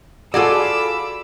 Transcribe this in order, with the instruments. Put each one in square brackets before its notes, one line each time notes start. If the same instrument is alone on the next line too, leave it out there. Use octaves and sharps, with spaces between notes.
[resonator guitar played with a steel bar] F4 G#4 D5 [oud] F#4 A4 [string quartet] B5 D6 E6